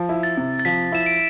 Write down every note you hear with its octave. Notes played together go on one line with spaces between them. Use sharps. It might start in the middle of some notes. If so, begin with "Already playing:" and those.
Already playing: F3
E4
A6
C3
A6
F3 B6
E4 E7
D7